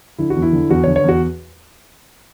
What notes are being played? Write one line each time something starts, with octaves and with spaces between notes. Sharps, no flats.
D3 E4
F#4
E2
E4
D3
E2 F#4
C#5
D3
C#5
E2 F#4